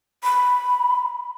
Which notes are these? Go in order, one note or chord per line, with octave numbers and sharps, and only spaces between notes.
B5